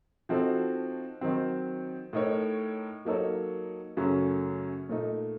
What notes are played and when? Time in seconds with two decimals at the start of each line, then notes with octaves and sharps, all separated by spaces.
0.29 F3 C4 D#4 F#4 A4
1.21 D#3 F#3 C4
2.13 A2 A3 D#4 A#4 C#5
3.05 F#3 A#3 D#4 A4 C#5
3.97 F#2 C#3 F#3 A3 C#4
4.89 A#2 A3 D#4